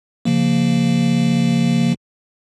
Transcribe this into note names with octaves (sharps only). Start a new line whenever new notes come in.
C#3 F3 A#3